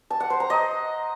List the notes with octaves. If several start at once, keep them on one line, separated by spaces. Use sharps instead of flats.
A5
F#5
C5
A#5
D#5